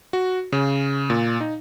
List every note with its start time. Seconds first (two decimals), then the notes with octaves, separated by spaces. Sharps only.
0.13 F#4
0.52 C#3
1.10 A#2
1.41 D#4